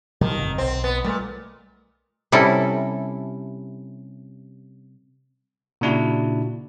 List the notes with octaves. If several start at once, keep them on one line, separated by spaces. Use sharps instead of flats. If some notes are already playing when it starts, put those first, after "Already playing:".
C3 D#3 F3 G3
G1 F2
B1 C4
B3
A#2 G3 A3
C3 G3 C#4 E4 A4
A#2 C#3 D4 E4 F#4